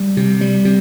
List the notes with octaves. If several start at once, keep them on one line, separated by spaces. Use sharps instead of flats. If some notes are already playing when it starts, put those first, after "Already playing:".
Already playing: G3
C3
G3
C3